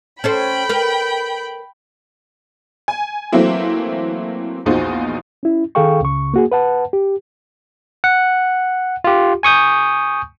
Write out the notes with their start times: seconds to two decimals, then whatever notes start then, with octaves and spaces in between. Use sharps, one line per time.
0.24 C#4 A4 C5 G5 B5
0.69 A#4 B4
2.88 G#5
3.32 E3 F#3 A3 A#3 C4 E4
4.66 A#1 E2 D#4 F4 F#4 C5
5.43 C#4 E4
5.75 D#3 G#4 A4 F5 G5 C#6
6.01 C#2 C#3 C#6
6.34 A#3 F#4 G#4
6.52 B4 F#5 A5
6.93 G4
8.04 F#5
9.04 F4 G4
9.43 G#5 C#6 D#6 G6